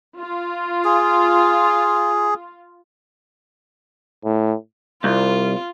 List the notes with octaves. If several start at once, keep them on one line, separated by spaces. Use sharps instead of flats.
F4
G#4
A2
C2 F4